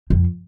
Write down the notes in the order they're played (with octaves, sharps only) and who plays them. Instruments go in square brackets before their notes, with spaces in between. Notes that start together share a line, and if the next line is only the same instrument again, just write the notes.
[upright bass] F2